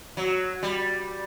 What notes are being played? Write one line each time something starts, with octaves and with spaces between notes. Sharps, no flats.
F#3
G3